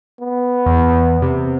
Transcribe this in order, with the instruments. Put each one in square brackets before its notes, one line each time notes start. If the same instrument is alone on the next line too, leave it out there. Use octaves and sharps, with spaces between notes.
[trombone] B3
[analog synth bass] E2
C3